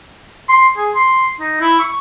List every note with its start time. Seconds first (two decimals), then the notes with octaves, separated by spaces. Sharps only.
0.49 C6
0.77 G#4
0.95 C6
1.40 D#4
1.61 E4
1.79 C#6